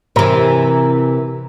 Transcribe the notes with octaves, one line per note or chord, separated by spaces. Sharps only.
C3 E3 A#4